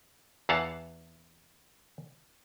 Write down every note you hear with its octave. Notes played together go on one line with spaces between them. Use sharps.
E2 E3 F5 F#5 A5